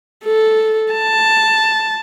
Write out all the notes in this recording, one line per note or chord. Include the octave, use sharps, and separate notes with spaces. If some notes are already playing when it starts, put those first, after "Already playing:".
A4
A5